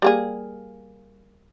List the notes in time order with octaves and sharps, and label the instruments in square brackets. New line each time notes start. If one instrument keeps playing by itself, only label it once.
[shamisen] G3 A#3 G#4